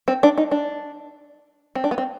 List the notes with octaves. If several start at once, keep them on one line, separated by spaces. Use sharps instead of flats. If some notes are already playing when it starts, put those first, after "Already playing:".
C4
D4
D#4
D4
C4
D4
B3
C4